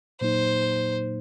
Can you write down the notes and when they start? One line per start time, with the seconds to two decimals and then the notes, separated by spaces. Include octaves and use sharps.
0.21 A#2 F#3 A#3 D#4 C5